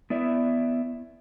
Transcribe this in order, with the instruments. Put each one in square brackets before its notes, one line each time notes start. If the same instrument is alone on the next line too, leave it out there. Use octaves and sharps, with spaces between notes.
[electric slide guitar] B3 E4 D5 E5